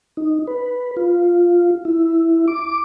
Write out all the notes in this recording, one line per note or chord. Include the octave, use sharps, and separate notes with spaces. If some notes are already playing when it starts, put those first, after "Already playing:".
D#4
B4
F4
E4
D6